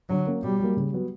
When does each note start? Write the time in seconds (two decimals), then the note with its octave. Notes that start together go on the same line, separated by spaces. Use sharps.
0.09 D3 F#3
0.27 A#3 C#4
0.43 B2 G3
0.60 F#3 A#3
0.77 C#3
0.93 F#3 B3